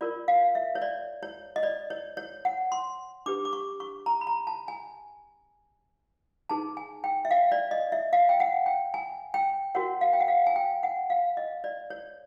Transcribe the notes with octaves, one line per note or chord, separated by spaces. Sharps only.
F4 A#4 C#5 D5
F5
E5
C#5
D5
C#5
D#5
D5
C#5
C#5
F#5
C6
D4 G4 B4 D6
D6
C#6
C#6
A#5
B5
A#5
A5
G#5
D#4 G#4 B4 A5
G#5
G5
E5
F5
D5
D#5
E5
F5
G5
F#5
G5
G#5
G5
F#4 A#4 C#5 F#5
F5
G5
F#5
F5
G#5
G5
F#5
F5
D#5
D5
C#5